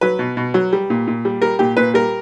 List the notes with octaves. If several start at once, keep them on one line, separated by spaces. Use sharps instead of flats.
F#3 B4
B2
B2
F#3
G3
A#2
A#2
G3
G3 A#4
A#2 G4
A#2 B4
G3 A#4